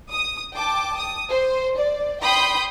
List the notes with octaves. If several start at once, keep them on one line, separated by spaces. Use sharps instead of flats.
D#6
G5 A5 D6
D#6
C5
D5
G5 B5 C6 D#6 G6